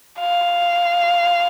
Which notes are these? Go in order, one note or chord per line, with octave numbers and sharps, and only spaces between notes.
F5